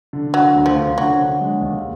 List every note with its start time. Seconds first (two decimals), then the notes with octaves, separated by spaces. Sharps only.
0.13 D3
0.34 D3 F#3
0.55 D2
0.66 F3
0.76 D3
0.98 D3 F#3
1.19 D3
1.41 G#3
1.61 D#2